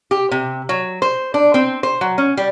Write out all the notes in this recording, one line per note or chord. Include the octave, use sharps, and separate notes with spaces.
G4
C3
F#3
C5
D4
C4
C5
F#3
C#4
G3